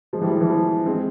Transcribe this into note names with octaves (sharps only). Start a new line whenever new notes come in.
F3 G#3
E3 G3
F3
E3
F3
G#3 C4